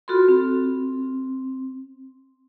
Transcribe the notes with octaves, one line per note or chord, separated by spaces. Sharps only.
F4 F#4 A4 B5 C6
C4